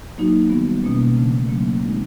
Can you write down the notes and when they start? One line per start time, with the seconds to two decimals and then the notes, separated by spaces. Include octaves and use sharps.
0.17 F#3 A#3 D#4 F#4
0.50 D#3 G3 B3
0.83 B2 G3 A#3 C#4
1.16 C#3 E3 A3 D4
1.49 C#3 F#3 A#3 C#4
1.82 D#3 G#3 C4 D#4 F#4